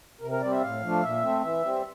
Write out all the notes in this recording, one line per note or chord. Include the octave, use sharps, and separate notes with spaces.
C3 A#4
A#4
G3 C4 D5
E5
A2 F5
F3 A3 D4
A#2 E5
A3 C4
E3 E5
G3 C4